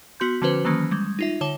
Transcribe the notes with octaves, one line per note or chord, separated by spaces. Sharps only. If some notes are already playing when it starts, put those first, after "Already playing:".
B3 F#4 C6 G6
D3 F3 C#4 F#4 B4 C5
D#3 E3 F#3 A#3 C#4
G3 G#3
D#4 F4 E5
D3 C#5 A5 D6 E7 G7